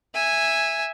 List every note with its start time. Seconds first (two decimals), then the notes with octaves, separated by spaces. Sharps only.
0.14 E5 G#5